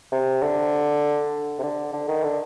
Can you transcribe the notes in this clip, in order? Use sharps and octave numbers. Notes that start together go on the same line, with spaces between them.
C3
D3
C3
D3
D3
D#3
D3